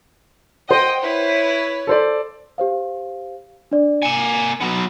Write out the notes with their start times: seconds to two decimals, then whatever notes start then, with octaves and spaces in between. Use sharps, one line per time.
0.69 C5 D#5 F#5 G5
1.01 E4 B4 C#5
1.87 A4 C5 D5
2.58 G4 C5 F5
3.71 D4 D5
4.02 A#3 G#5 C#7 E7
4.61 F#3 B3